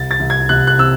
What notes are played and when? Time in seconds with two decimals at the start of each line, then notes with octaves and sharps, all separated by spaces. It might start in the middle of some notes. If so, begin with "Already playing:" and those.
Already playing: C2 A6
0.11 A6
0.19 C2
0.30 G#6
0.49 C2 F#6
0.67 F#6
0.78 C3 E6